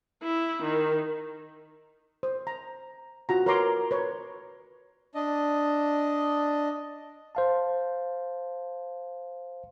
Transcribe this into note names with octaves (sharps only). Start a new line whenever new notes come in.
E4
D#3
C5
A#5
F4 F#4 A#5
A#4 B4 C#5 A#5 C6 D6
B4 C#5
D4 D#5
C5 F5 A5